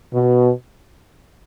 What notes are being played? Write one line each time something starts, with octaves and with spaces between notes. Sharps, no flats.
B2